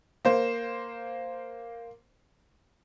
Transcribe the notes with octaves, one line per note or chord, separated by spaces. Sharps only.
A#3 C5